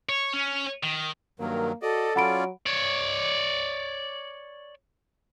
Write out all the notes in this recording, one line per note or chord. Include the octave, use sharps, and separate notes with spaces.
C#5
C#4
D#3
G2 D#3 F#3 A#3 A#4
F#4 A4 D5 D#5
F#3 C#4 F4 D5 F#5 B5 D7
C#5 D5